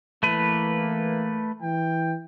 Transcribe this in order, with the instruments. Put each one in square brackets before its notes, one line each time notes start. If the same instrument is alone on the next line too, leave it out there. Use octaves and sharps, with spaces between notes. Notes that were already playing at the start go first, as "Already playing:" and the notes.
[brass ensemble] E3 A#3 [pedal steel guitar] A3 B4
[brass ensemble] E3 G5